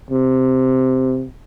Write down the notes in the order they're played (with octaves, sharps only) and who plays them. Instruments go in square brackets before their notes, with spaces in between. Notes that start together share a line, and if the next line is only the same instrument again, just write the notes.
[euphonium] C3